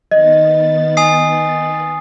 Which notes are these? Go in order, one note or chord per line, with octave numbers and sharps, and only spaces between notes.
D#3 B3 D#5 A6
G#5 D#6 C7